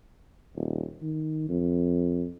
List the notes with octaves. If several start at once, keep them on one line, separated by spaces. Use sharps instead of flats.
D#1
D#3
F2